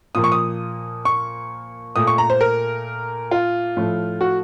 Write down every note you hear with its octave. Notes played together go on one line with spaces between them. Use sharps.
A#2 F3 A#3 D#6
C#6
D#6
C#6
A#2 A3 D#6
C#6
A#5
C5
A#4
F4
A2 F3 A3
F#4